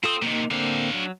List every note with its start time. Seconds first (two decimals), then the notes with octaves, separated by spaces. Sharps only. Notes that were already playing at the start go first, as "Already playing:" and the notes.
0.04 C4 F4 A4 D#6
0.22 C3 D#3 A#3 D#4
0.51 D3 A#3 C4 D4 F5
0.94 F#3